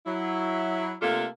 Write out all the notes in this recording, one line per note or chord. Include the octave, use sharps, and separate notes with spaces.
F#3 E4
C3 A3 A#3 D4 F4 A4